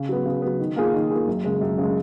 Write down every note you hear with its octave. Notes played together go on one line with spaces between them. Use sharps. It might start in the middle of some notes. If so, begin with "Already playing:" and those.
Already playing: C#3
F#3 B3
C#3
F#3 B3
D#3
A#3 F4 G#4
D#3
A#3 F4 G#4
F#2
C#3 G#3
F#2
C#3 G#3